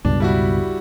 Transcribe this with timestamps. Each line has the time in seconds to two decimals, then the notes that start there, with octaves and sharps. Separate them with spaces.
0.05 C#2 G2 B2 D4
0.20 G3 E4 F#4